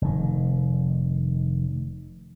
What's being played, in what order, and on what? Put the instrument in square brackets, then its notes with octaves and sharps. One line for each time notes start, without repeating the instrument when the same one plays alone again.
[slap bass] F1 D#3